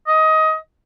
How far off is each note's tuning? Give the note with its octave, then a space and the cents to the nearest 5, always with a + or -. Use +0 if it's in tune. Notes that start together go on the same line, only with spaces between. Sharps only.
D#5 +20